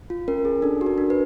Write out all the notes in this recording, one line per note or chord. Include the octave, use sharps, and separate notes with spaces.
F4
C#4 A#4
G#4
D4 A4
F#4
A#4
D4
B4